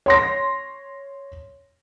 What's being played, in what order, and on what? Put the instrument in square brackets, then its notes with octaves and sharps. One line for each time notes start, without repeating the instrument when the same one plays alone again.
[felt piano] C#5 C6 A#6